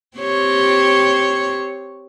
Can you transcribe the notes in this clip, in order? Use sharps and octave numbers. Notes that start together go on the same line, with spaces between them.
C4 G4 C#5